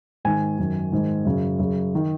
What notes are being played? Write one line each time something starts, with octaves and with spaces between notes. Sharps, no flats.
G#2 D#3 G#5
F#2 D#3
G#2 D#3
F#2 C#3
F#2 C#3
D#3